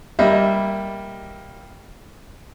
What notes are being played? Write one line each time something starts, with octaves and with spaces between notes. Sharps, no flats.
G3 A#3 D#5 E5